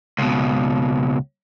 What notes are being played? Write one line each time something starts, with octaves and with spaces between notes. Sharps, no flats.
C#2 B2